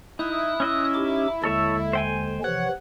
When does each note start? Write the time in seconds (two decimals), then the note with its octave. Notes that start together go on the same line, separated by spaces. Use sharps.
0.19 D#4 E4 D#6 F#6
0.60 C#4 D#5 E5
0.94 D#4 G4 D6
1.44 D#2 D3 G#3 A4 C#5 E5
1.93 C5 G5 G#5
2.44 C3 E3 F3 C#5 F#5